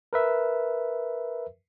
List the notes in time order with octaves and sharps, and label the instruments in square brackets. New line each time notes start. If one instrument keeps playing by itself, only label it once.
[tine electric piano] A#4 B4 E5